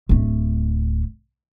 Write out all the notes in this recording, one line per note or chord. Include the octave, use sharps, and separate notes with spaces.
D1 A3